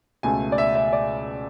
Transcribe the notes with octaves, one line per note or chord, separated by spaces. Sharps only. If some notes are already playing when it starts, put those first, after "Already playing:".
C#2 B2 A3 G#5
D5
E5
E5
D5